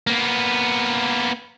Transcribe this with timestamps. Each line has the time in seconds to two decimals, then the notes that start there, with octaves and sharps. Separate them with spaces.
0.07 A#3 B3